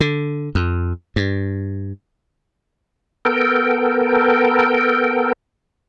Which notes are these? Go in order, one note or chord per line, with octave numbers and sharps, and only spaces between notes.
D3
F2
G2
B3 A4 A#4 G5